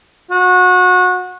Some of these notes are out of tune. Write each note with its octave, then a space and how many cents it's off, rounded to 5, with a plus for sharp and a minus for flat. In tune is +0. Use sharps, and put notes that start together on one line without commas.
F#4 -25